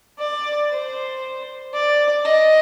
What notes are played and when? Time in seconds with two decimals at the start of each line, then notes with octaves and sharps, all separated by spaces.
0.19 D5
0.71 C5
1.74 D5
2.25 D#5